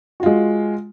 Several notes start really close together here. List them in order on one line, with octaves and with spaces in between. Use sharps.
F#4 F4 G#3